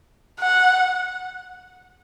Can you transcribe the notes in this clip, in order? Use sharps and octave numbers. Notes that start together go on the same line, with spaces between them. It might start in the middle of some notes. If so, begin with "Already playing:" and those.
F#5